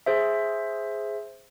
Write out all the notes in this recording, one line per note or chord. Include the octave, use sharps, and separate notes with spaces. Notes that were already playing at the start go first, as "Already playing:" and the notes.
G#4 C5 E5